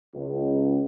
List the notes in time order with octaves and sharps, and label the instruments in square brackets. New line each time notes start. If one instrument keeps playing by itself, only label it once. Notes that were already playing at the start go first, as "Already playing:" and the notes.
[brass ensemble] C#2